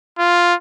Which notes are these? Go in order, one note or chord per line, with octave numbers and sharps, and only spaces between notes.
F4